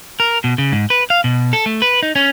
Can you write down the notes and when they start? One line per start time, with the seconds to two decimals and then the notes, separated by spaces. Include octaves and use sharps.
0.20 A#4
0.44 B2
0.58 C#3
0.72 G#2
0.90 B4
1.10 F5
1.24 B2
1.53 A4
1.66 A3
1.82 B4
2.03 D#4
2.16 C#4